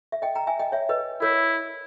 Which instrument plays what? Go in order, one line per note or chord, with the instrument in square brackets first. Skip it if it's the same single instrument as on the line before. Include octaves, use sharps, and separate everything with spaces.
[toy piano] E5
D#5 G5
G5 A#5
E5 G#5
D#5 G5
C#5 E5
B4 D#5
[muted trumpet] E4 [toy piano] A#4 C#5